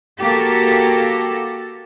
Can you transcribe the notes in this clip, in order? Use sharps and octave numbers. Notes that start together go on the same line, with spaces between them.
A#3 F#4 G4 A4